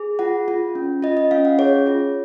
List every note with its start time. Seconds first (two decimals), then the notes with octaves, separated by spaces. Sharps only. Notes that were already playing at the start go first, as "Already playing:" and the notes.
Already playing: G#4
0.19 F4 F#5
0.48 F4
0.75 C#4
1.03 F4 D#5
1.17 D#5
1.31 C#4 F5
1.45 F#5
1.59 G#4 C#5
1.86 F4 C#5